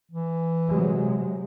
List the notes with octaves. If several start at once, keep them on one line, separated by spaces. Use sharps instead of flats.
E3
C3 F#3 G#3